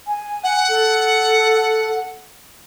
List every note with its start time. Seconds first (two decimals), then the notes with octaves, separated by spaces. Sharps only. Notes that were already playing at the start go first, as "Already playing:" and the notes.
0.07 G#5
0.43 F#5
0.69 A4